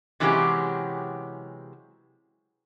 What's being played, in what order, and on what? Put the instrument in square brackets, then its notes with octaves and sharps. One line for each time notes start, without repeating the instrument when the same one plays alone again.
[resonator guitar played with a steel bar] C3 E3 F#3 G#3 C#4 G4